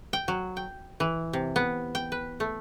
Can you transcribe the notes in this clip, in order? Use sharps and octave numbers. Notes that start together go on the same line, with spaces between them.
G5
F#3
G5
E3
C3
B3
G5
B4
A3